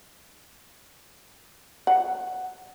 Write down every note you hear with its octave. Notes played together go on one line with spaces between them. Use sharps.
F#5